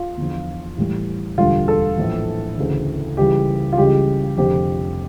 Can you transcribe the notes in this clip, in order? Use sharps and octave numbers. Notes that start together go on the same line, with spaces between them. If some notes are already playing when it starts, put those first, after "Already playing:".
Already playing: F4
E2 D3 F3
A1 A2 E3 G3
E1 D2 D3 G3 F4
A4
A#1 A2 E3
D2 C#3 E3
C#2 C#3 E3 G3 G4
F4
C#2 C#3 E3 G3 G4
F1 F2 D3 F3 G4